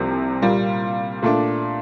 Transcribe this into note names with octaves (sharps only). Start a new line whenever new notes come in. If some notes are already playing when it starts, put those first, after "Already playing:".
Already playing: C2 C3 F3 A#3
A#2 G3 A#3 F4
A#2 A3 D4